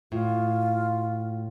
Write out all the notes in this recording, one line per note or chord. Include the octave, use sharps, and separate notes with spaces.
A2 F4